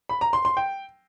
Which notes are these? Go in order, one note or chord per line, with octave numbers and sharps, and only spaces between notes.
B5
A#5
C6
C6
G5